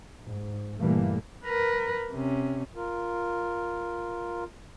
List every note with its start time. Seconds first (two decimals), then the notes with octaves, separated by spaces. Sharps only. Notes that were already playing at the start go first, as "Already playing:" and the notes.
0.24 G#2
0.79 G1 A#2 E3 G3 A3 A#3
1.45 A#4 B4
2.12 C3 C#4
2.76 F4 A#4